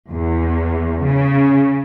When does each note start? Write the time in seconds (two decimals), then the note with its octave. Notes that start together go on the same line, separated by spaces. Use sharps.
0.11 E2
1.03 C#3